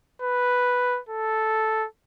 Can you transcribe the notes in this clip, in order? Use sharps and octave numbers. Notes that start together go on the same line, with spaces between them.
B4
A4